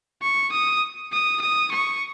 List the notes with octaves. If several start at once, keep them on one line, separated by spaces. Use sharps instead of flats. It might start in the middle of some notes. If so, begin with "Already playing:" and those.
C#6
D#6
D#6
D#6
C#6